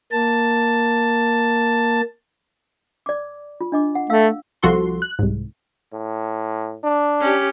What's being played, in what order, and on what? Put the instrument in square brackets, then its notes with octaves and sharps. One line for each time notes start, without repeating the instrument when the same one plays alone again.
[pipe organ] A#3 A5
[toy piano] D5 D6
F4
D4 D#5 D6
F#5
[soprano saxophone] A3 [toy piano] F5 E6
[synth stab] C2 F3 F#4 A4 C6
F#6
C2 G#2
[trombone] A2
D4
[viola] C#4 G4